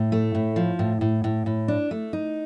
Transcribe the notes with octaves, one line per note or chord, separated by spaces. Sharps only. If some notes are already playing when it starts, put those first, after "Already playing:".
Already playing: A2
A3
A2
F3
A2
A2
A2
A2
D4
A3
D#4